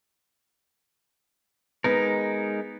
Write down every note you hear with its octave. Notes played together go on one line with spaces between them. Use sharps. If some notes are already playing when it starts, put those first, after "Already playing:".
G#3 B3 D#4 A#4